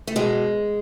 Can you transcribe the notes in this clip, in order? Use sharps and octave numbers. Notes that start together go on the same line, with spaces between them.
A3
B2 G#3